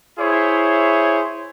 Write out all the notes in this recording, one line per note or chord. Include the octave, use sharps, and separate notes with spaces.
E4 G#4 C5 C#5